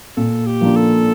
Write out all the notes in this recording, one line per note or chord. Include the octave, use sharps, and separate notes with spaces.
A#2 A4
G4
F3 A#3 D4 F4
A4